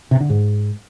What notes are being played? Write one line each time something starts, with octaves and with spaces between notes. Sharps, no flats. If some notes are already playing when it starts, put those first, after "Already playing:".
C3
D3
G#2